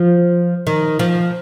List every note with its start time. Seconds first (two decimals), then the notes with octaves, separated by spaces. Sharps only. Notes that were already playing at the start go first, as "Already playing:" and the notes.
Already playing: F3
0.67 D#3
0.99 F3